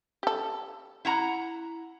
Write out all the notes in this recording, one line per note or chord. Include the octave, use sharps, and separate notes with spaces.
G4 A4
E4 F#5 A#5